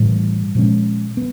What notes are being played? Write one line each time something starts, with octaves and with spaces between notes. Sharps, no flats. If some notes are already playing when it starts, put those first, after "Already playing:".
Already playing: A2 E3 G3
A#2 F3 G#3 C#4
B3